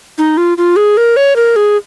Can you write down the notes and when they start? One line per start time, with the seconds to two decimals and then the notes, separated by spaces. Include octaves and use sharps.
0.18 D#4
0.37 F4
0.58 F4
0.76 G#4
0.97 A#4
1.16 C#5
1.36 A#4
1.56 G#4